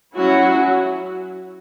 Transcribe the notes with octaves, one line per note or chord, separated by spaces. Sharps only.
F#3 C#4 E4 F#4